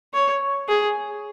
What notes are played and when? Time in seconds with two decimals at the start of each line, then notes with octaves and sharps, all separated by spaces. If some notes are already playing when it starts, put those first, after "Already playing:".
0.14 C#5
0.68 G#4